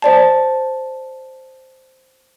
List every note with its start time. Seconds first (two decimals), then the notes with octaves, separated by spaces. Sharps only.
0.02 C5 D5 A5